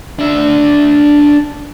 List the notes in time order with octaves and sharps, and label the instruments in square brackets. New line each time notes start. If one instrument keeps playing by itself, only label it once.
[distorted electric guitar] D4 E5